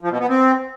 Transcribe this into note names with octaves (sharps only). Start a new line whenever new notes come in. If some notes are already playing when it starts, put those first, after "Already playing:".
F3
B2
B3
C4